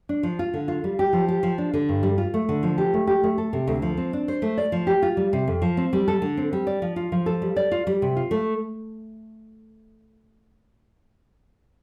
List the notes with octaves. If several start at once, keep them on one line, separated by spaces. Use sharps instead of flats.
D4
F3
F4
D3
F4
G3
G4
F3
G4
F3
D4
D3
G2
G3
F4
A3
D3
F3
G4
A3
G4
A3
A4
C3
D2
F3
C4
D4
C5
A3
D5
F3
G4
F4
G3
C3
F2
F3
C4
G3
A4
D3
C4
G3
D5
F3
F4
F3
A4
G3
D5
F4
G3
C3
F4
A3